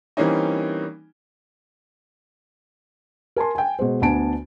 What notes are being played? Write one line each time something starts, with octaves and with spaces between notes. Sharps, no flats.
E3 G3 A#3 C4 C#4 D#4
A#4 G#5 A5 C6
G5 G#5
B2 G#3 C5
D2 B3 D4 G#5 A5 D7